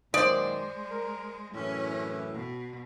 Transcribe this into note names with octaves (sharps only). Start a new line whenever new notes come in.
F#2 A#2 D#3 G#3 C5 D5 D#6
A#4
F#2 A2 E3 C#4
B2